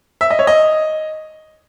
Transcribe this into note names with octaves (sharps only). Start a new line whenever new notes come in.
E5
D#5
C#5
D#5